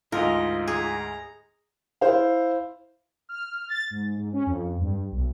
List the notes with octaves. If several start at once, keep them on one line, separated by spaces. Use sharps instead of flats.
D2 G#2 F4 A#4 D#5
G#4 A#5
E4 C5 F5
F6
A6
G#2
G#2
C#4
F2
G2
B1